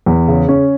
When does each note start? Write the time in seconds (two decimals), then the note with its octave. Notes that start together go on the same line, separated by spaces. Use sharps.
0.06 E2
0.28 C#3
0.49 C#4